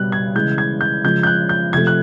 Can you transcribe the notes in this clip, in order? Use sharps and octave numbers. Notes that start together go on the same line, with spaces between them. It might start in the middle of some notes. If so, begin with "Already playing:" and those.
Already playing: B2 G3 F#6
G#6
C#3 E3 G#3 G6
G#6
G6
C#3 F3 G#3 G6
G6
F#6
G6
C3 F3 A3 G#6
F#6